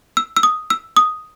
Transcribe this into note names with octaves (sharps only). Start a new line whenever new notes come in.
E6
E6
D#6
E6
D#6